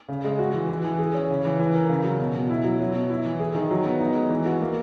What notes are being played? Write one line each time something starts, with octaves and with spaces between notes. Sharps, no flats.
C#3
G#3
F#4
E3
E3
E3
G#4
C#4
C#3
E3
E3
A#4
C#3
F#3
B2
B2
E4
F#3
F#3
B2
E4
E3
G#4
D#3
F#3
B3
D#4
G#3
E3
F#4
A#3